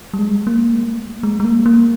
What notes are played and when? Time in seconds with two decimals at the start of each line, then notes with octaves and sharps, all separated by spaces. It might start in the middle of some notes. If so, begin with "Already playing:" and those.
0.14 G3
0.19 G#3
0.47 A#3
0.75 G#3
0.83 A#3
0.93 G#3
1.03 A#3
1.23 G#3
1.40 G#3
1.45 A#3
1.66 A#3